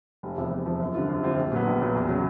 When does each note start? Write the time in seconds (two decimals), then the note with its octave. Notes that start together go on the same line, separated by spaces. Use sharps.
0.23 F1
0.38 E2 C3 F3
0.51 F1
0.66 E2 C3 F3
0.80 F#2
0.94 D3 G3 C4 F4
1.09 F#2
1.23 D3 G3 C4 F4
1.37 A#1
1.52 A#2 F#3 B3
1.67 A#1
1.81 A#2 F#3 B3
1.95 E2
2.09 C#3 F#3